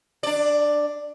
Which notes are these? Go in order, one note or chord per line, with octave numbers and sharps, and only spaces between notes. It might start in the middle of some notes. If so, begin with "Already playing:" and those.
D4 D5